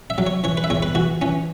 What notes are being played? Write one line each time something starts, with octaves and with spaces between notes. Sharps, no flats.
E5
F#3
C#5
E3 C#5
B4
E5
E2 C#5
B4
E3 F#4
E3 C#4